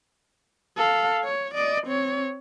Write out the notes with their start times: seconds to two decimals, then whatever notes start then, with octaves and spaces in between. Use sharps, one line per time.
0.77 A4 F5
1.24 C#5
1.54 D5 D#5
1.87 C4 C#5